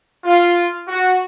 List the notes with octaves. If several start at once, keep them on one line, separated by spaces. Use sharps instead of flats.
F4
F#4